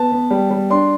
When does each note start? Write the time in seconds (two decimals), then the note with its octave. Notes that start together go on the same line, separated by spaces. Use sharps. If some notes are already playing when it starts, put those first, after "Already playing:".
Already playing: B3 A5
0.12 B3
0.30 G3
0.50 G3
0.70 D4 C6